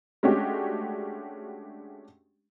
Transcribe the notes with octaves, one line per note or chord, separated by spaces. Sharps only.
G#3 A3 C#4 D4 F#4 G4